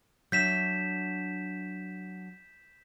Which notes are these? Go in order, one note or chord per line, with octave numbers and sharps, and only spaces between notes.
F#3 D4 E5 G6 B6 E7